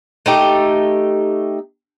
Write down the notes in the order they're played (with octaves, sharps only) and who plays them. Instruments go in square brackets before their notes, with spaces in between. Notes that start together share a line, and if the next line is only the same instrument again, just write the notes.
[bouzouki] A3 D#4 G4